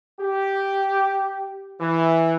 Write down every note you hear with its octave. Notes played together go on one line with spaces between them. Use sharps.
G4
E3